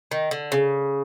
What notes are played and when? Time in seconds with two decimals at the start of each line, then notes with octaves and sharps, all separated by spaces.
0.11 D#3
0.31 D3
0.52 C#3